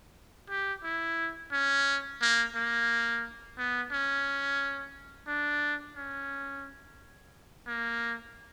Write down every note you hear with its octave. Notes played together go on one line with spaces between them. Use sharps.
G4
E4
C#4
A#3
A#3
B3
C#4
D4
C#4
A#3